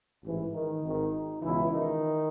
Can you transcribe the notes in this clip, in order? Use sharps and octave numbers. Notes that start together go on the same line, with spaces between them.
A1 G#2 E3
D#3 D#4
G#1 G#2 D#3
C#2 B2 E3 E4
D#3 D#4